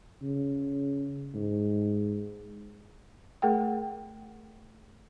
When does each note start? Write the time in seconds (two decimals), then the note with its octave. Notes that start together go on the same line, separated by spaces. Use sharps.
0.22 C#3
1.35 G#2
3.42 A3 G#4 A#4 F#5 G5